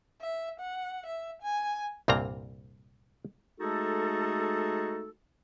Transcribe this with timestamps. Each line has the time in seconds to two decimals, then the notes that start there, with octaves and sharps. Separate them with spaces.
0.21 E5
0.59 F#5
1.06 E5
1.42 G#5
2.08 C2 G2 A#2 A#3 C4 A#5
3.59 G#3 A3 D#4 F#4 G#4 A4